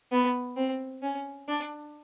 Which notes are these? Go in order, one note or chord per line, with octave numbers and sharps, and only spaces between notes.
B3
C4
C#4
D4